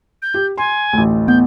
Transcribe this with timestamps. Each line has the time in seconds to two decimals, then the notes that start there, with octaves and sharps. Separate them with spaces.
0.22 G6
0.34 G4
0.58 G#5 C6
0.93 A1 D2
1.28 B3 G6